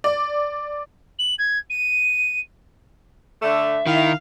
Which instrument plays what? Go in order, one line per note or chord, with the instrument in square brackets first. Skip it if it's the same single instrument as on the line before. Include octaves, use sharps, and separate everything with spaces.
[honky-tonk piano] D5
[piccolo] F#7
G#6
D#7
[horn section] D3 A3 [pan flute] E5
[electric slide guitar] D#3 [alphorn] E4 [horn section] F5